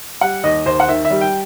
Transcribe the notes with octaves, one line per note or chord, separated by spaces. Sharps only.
G3 F#5
D#2 D#5
D#2 C5
F#5
D#3 E5
E5
G3
G5